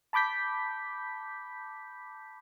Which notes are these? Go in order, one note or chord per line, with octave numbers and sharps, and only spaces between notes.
A5 B5 D6 G6 B6